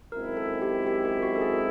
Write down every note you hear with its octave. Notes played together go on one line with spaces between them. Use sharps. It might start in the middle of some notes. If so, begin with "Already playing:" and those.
F#2 D#3 G#3 C4 E4 A#4
A4
G4
G4
G4
F#4
A4
G#4